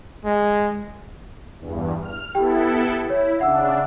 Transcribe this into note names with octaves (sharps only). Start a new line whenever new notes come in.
G#3
E2 G2
F6
B3 E4 G4 A4 G5
E4 C#5
C#3 D4 E5 F#5 E6